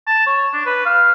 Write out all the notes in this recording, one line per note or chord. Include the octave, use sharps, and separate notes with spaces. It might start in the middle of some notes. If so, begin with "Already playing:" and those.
A5
C#5
D4
B4
F5